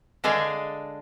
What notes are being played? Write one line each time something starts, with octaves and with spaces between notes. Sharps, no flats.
D3 G#3 D4 G#4 F5